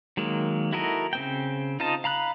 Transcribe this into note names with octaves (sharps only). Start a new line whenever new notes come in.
D#3 F#3 G#3 A#3
E4 F#4 A4 A#4 D#5
C#3 C4 G5
D#4 F4 C5 D#5 A5
F5 A#5 B5 F#6